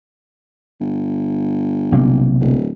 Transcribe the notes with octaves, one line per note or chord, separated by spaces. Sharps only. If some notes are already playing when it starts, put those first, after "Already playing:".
G1
B1 C3 A#3
D1